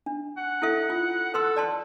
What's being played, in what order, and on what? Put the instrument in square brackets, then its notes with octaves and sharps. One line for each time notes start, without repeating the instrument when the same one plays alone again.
[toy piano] D4
[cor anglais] F#5
[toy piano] E4 A4 E5
F4
[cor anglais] A4 [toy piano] B4 C6 E6
[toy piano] D5 A5 C6